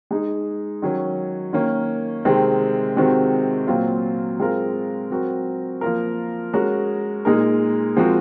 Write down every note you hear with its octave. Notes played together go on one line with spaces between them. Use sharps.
G#3 D#4 G#4
D#3 F#3 C#4
D#3 A#3 C#4
C3 D#3 G#3 C4
C3 D#3 G#3 C4 F#4
A#2 F#3 C4 F4
G#3 C4 F4 A#4
F#3 C4 F#4 A#4
F3 A#3 F4 A#4
G#3 C#4 F#4 A#4
A#2 G#3 D#4 A#4
F3 G#3 C4 F#4 A#4